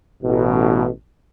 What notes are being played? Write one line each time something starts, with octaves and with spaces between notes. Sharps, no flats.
A1 B2